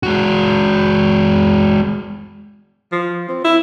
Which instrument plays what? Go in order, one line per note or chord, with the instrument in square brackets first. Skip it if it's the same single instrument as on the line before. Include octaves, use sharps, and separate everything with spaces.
[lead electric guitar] G#3 F#4
[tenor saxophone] F3
C4
E4